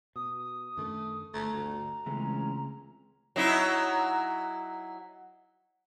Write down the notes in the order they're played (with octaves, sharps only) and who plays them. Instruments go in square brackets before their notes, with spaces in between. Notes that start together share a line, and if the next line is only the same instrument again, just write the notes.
[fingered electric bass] B2 [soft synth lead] D#6
[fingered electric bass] F#2 D#3 D4 [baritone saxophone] A3
[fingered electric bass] G1 [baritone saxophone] A3 [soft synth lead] A#5
[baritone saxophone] D2
[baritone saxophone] C#2 [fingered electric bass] C#3 A3 C4 [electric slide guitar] E3 G#3 C#4
[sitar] F#3 D#4 E4